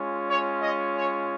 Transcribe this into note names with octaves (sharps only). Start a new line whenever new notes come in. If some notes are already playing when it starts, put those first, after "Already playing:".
Already playing: G#3 C#4 F4
C#5
D#5
C#5